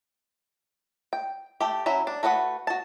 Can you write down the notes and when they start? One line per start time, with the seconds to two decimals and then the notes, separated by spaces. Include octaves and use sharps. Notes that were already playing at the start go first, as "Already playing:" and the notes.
1.13 G5
1.60 A3 G4
1.86 F#3 C#4 E4 E5
2.07 D4
2.23 A3 F#4 B4 D5 F#5
2.67 F#4 A5